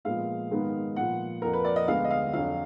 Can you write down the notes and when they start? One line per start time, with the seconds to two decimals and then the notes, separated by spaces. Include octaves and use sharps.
0.05 A#2 F3 G#3 B3 F5
0.51 G#2 D#3 G#3 B3
0.96 A#2 F3 B3 F#5
1.42 F2 F3 A#3 A#4
1.53 B4
1.65 D5
1.76 D#5
1.88 D2 D3 G#3 B3 F5
2.04 D#5
2.11 F5
2.33 F2 D3 F#3 F5